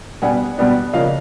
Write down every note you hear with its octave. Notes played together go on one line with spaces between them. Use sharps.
B2 G3 B3 D4 F#5 G#5
B2 G3 B3 D4
C#3 F3 A#3 D4 D#5 F5